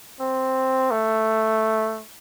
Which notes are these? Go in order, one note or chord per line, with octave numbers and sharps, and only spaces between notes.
C4
A3